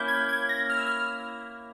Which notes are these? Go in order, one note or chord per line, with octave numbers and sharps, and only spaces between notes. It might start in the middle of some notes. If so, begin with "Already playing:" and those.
Already playing: A#3 C#4 E4 G6
G#6
G#6
A#6
F6
E6
F6